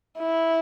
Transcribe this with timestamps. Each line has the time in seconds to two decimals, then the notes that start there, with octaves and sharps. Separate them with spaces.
0.19 E4